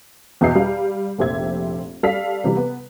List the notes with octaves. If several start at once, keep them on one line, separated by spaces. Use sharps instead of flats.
E2 B2 D#5 E5 G6 C7
G3 F5
F1 A#1 G4 C5 E5 G#6
G3 A4 D5 F5 B6
C3 E3 G3
B3